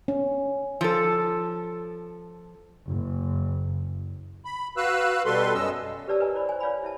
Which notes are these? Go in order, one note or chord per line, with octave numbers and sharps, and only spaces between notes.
C#4
F3 A4
F#1
B5
F#4 B4 F5 E6 F#6
B2 G3 A4 B4 C6
F#2 C#4 D#5 E6
G4 B4 C#5 D5 A5 E6
A#4 B4 D#5 G#5 A#5
E4 C5 D5 B5
C5 G#5
B4 C#5 D5 F5 G#5 B5
E4 E5 A5